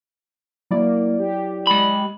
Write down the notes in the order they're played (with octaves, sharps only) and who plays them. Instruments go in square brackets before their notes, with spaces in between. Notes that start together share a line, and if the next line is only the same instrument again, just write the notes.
[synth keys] F#3 E4 D5 [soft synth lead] A#3
[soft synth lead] G4
[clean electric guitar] G#3 B5